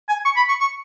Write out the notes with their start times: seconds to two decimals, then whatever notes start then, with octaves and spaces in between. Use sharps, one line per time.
0.09 G#5
0.25 C#6
0.36 B5
0.49 C#6
0.60 C#6